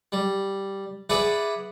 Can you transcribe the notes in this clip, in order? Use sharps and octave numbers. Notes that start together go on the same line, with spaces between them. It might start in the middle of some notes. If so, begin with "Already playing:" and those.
G3
G#4 B4 D5 E5 F#5